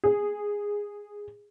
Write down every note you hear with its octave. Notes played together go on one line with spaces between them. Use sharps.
G#4